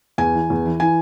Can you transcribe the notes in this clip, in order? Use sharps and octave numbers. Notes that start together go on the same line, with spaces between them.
E2 G#5
E3
E2
E3
E3 G#5